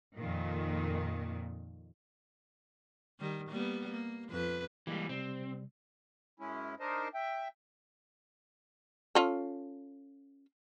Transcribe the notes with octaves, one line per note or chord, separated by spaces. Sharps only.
F2 A#2 D#3
D#3 G3
G3 A#3 B3
A#3
F2 B4
E3 G3 G#3 A#3 G4
C3 G3 C4
F#2 G#3 C#4 E4
D4 D#4 A#4 C5 D#5
E5 G5
C#4 F4 A4